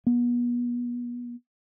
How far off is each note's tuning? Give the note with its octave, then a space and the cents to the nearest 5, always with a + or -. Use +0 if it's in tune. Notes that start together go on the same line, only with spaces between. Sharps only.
B3 -35